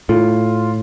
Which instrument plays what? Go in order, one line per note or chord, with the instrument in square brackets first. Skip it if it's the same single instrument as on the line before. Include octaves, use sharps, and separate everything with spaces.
[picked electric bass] A2 [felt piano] F4